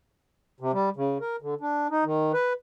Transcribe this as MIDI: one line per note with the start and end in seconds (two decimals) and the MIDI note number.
0.60 0.72 48
0.73 0.89 55
0.96 1.18 49
1.21 1.36 70
1.42 1.54 50
1.61 1.87 62
1.90 2.04 63
2.05 2.32 51
2.33 2.53 71